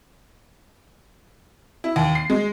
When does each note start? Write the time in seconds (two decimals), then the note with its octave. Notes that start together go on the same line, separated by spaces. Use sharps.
1.84 E4
1.96 D#2
2.15 C7
2.30 G#3